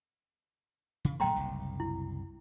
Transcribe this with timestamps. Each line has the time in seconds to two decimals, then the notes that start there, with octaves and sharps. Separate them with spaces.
1.05 C#3
1.20 A#2 F#3 A3 G5 A#5 C6
1.36 F#1 C2
1.80 E4